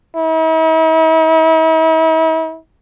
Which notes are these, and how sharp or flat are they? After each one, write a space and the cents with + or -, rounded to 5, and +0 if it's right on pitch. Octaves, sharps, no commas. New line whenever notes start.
E4 -45